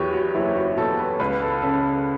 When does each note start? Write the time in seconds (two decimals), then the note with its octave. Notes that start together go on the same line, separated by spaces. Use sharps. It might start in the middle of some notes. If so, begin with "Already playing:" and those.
Already playing: E2 F#3 G4 B4 C#5
0.13 F#4
0.35 F#1 E4
0.56 F#4
0.77 B2 A4
0.99 B4
1.20 C#2 B4
1.42 A4
1.62 C#3 A4